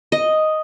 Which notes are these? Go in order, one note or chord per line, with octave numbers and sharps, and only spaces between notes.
D#5